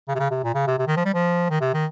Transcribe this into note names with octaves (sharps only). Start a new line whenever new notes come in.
C#3
C3
C#3
C3
A#2
C#3
C3
C3
D#3
F3
G3
F3
D#3
C3
D#3